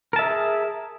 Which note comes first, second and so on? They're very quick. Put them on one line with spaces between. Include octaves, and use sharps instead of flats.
A#4 A5 E5 G#4